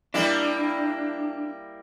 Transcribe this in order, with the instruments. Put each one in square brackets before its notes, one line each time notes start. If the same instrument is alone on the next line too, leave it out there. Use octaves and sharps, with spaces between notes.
[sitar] G3 A#3 E4 [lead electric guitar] D4